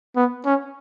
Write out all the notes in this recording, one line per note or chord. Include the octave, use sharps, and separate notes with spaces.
B3
C#4